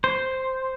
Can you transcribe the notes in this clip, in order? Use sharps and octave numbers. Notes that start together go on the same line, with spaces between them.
C5